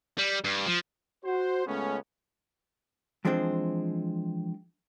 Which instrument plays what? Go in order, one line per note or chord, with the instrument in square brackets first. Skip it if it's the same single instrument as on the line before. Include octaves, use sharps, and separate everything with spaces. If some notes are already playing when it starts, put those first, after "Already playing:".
[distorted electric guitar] G3
G2
F3
[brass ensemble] F#4 C5
C#2 G#3 A3 B3 C#4
[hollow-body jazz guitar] E3 F3 G#3 C4 D4 C5